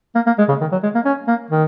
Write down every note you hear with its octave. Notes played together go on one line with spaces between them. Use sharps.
A#3
A#3
G#3
C#3
D#3
F#3
G#3
A#3
C#4
A#3
D#3